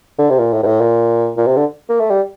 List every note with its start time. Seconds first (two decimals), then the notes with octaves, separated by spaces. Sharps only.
0.19 D3
0.30 C3
0.39 A#2
0.53 A2
0.63 G2
0.67 A2
0.81 A#2
1.37 A#2
1.47 C3
1.56 D3
1.89 A#3
2.00 A3
2.11 G3